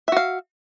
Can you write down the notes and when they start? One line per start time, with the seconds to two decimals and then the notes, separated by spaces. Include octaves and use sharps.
0.08 E5
0.12 F#4
0.17 F5